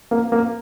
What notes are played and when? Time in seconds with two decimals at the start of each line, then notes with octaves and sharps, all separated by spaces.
0.11 A#3
0.32 A#3